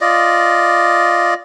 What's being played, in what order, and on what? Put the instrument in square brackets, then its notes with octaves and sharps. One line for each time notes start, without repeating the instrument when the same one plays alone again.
[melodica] F4 D5 D#5